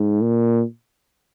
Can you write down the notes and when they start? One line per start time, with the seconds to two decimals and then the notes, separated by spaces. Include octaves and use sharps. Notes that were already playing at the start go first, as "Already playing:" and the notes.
Already playing: G#2
0.22 A#2